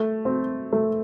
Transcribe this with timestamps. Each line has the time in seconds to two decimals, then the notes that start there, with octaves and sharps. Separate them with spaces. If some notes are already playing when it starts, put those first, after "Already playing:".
Already playing: A3
0.25 C4
0.73 A3